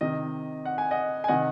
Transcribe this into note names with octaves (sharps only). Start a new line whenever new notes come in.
C3 D#3 D#5
F#5
G#5
D#5 F#5
G#5
C3 D#3 D#5 F#5